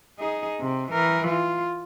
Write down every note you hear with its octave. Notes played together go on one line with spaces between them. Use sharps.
D#4 G#4
C3
E3 A#4
F4